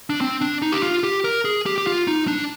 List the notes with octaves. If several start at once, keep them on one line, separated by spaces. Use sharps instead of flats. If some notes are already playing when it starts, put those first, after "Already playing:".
D4
C4
D4
D#4
G4
F4
G4
A#4
G#4
G4
G4
F4
D#4
D4